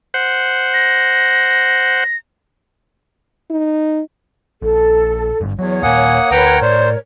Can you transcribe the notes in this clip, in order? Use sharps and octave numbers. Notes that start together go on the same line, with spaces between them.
C5 F#5
A#6
D#4
A#1 A4
G#1 G2
E2 F#3 C#5
D#1 A#2 A#3 F#5 G#5 D#6
D2 A#4 B4 C#5 F#5 G5 A#5
A2 C5 D5